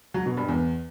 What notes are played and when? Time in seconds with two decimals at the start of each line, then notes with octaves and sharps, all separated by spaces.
0.14 F#3
0.26 B2
0.37 G2
0.49 E2